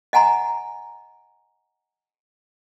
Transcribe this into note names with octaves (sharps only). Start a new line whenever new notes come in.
D#5 F#5 G#5 A#5 C6